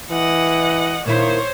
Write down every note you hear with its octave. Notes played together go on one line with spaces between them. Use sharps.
E3 D#5 F#5
A#2 D#3 E4 C5 C#5